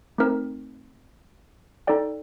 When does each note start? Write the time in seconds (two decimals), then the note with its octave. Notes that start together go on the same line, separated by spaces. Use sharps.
0.18 A3 C4 D#4 A#4
1.87 D#4 A4 D5 G5